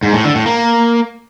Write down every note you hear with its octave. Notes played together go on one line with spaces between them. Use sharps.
G#2
A2
D3
A2
A#3